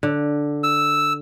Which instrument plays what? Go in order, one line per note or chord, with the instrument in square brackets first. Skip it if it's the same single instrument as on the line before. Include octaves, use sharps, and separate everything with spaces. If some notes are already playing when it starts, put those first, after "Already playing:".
[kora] D3
[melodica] E6